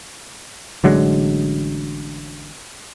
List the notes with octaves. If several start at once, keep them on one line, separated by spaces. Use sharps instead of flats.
A1 D3 F#3 G#3